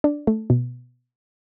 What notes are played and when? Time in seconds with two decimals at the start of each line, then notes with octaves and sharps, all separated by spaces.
0.04 D4
0.27 A3
0.50 B2